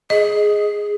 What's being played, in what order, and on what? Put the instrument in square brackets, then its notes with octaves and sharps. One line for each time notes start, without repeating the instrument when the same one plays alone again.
[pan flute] G#4 [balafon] D#5